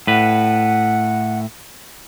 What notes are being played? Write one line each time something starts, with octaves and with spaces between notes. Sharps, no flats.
A2 B4 F#5